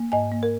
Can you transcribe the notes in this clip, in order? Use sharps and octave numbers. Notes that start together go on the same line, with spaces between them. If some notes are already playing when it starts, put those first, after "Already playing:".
Already playing: A#3
G#2 D#5 G#5
A#3
A#4